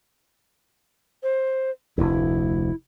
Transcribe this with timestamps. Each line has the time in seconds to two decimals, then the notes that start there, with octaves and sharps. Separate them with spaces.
1.23 C5
1.98 F1 D2 E4